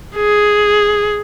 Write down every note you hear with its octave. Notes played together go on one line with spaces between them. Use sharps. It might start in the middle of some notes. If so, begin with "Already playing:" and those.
G#4